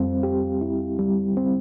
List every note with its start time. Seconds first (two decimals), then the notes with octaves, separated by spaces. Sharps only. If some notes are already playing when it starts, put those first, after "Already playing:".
Already playing: F2 G3 C4
0.23 G4
0.61 E4
0.99 G3
1.37 C4